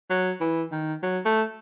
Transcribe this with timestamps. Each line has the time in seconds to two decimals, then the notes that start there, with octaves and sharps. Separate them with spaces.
0.10 F#3
0.40 E3
0.72 D#3
1.03 F#3
1.25 A3